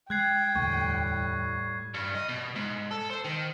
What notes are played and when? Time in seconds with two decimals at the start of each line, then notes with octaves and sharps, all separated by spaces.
0.10 G#3 G5 F#6 G#6 C7
0.56 E1 D2 A2 G3 A3 C#6
1.94 G2
2.15 D#5
2.29 B2
2.56 G#2
2.91 A4
3.10 C5
3.24 D#3